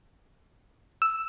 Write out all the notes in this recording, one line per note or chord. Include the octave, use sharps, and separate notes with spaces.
E6